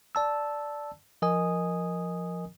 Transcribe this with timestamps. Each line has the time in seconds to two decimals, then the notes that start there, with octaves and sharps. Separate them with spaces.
0.15 D5 A5 E6
1.22 F3 A#4 D#5 G#5 D#6